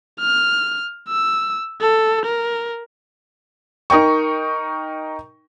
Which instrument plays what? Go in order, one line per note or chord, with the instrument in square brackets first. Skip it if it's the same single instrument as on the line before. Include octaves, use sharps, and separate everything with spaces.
[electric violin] F6
E6
A4
A#4
[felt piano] D#4 A#4 G5 C#6